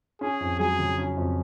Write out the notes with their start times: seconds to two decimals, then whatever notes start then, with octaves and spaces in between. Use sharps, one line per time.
0.21 C#4 G#4
0.40 F2
0.59 F#3 G#4
0.79 C#3
0.98 C#4
1.17 F2